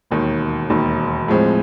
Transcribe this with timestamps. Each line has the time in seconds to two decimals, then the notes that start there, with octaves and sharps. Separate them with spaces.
0.11 E1 D#2 D#3
0.70 E1 D#2 D#3
1.28 A2 F3 G#3 C4